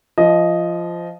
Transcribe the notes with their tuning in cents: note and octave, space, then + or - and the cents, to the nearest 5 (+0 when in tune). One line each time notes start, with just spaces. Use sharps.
F3 -15 D#5 +0